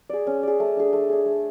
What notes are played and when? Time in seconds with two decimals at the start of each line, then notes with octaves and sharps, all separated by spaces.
0.09 G#4 D5
0.27 C#4
0.43 G#4 D5
0.60 A3
0.77 D4 G#4
0.93 A3
1.09 D4 G#4
1.26 A3